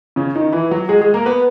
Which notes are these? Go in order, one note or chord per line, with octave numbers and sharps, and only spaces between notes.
C#3 C#4
D#3 D#4
E3 E4
F#3 F#4
G#3 G#4
G#3 G#4
A#3 A#4
B3 B4